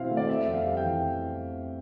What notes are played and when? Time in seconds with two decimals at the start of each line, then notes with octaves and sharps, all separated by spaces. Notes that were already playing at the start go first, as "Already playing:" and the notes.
Already playing: B2 C4 E4 F5
0.11 A3
0.17 D5
0.28 C4 E5
0.47 F2
0.54 F5
0.66 G3
0.72 F5
0.77 G5
0.84 E3